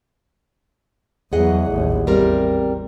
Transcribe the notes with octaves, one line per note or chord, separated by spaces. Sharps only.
E2 F#3 G#4 D#5 F#5
A1 D#2
E2 G3 C4 A#4